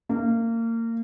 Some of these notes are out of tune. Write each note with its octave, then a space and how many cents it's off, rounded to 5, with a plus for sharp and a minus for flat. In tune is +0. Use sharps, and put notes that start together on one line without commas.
A#3 -30